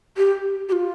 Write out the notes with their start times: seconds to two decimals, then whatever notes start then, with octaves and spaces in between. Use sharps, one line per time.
0.17 G4
0.69 G4
0.72 F4